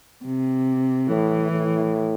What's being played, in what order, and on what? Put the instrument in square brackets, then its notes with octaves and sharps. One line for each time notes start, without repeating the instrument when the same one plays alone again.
[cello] C3
[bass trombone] A2 [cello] E3
[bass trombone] A2